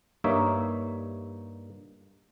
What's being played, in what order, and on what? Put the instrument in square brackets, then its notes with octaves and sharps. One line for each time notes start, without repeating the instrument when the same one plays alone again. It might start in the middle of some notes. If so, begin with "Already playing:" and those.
[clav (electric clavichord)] G2 A#3 D#4 C#5 E5